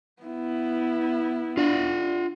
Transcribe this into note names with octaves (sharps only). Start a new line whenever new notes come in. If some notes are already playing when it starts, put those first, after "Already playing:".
B3 E4
D4 F4 F#5